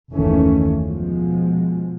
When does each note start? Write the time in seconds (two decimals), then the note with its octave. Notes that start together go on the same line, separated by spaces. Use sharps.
0.14 F#1 D#2 D#3 E3 A3 C#4
0.80 B2 F3 G#3